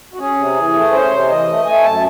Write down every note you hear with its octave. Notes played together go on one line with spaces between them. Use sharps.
F#4
C#4 G#4
C3
E3
A3
C#4 C5
C3
E3 D#5
A3
A3 G#5
F#2 A5